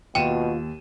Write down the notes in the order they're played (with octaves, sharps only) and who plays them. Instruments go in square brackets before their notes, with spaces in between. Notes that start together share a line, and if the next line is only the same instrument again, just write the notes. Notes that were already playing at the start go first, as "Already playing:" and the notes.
[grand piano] D#2 D#7 E7 [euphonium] B2 [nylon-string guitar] F4 [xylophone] G5